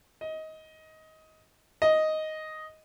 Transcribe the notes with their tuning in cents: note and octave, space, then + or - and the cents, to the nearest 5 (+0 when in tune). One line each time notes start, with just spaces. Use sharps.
D#5 +20
D#5 +5